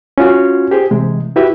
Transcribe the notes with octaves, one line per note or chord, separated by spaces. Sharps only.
C#4 F4 F#4
G4 G#4 C5
C3 E3 G#3
E4 F#4 G4 B4 E5